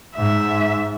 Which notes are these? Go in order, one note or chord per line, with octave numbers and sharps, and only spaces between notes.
G#2 E5